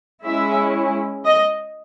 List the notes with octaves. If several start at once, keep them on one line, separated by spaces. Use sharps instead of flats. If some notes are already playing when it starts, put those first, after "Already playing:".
G#3 C#4 E4 E5
D#5